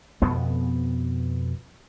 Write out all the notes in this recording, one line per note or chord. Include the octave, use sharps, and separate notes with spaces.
F2 B2 B3